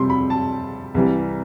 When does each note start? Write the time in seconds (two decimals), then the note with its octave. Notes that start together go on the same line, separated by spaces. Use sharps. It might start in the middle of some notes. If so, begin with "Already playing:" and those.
Already playing: F2 C3 G3 C6
0.10 B5
0.30 A5
0.94 C2 C3 E3 G3